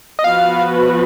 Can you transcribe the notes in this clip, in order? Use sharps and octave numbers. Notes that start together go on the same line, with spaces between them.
D#5
F3 B3 F#4 B4 F5